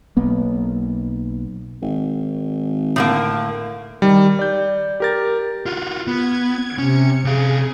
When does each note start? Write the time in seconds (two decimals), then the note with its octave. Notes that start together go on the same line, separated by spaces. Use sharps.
0.17 B1 A#3 B3
1.82 G#1
2.96 A2 D3 A#3
4.02 D#3 G3
4.39 D5 G6
5.00 G4 A#4 A6
5.66 F4 F#4
6.07 B3 G#6
6.78 C3 C#4 C#7
7.24 C3 G#4 F5